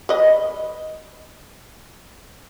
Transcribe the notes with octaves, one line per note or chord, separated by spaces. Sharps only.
B4 D#5